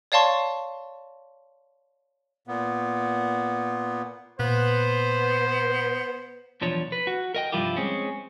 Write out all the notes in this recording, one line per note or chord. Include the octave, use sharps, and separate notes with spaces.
C#5 D5 F5 A5 C6 C#6
A#2 B3
A#2 B3 C5
B1 E2 F3 D4 C#5
B4
F#4
A#4 D#5 G5
C2 G2 F3 E4 F4 G4
G#3 C4 C#4